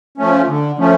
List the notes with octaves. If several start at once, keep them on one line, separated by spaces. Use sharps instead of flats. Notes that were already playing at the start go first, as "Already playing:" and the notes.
F3 A3 C#4
D3
F3 A3 C#4